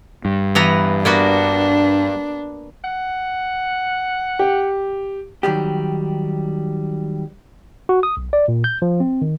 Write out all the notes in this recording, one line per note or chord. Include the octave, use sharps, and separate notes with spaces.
G2
E3 B3 A#5
A#3 B3 D4 F#4
F#5
G4
D#3 F#3 G3 G4
F#4
D#6
B1
D5
A#2
G6
F3
C4
D#3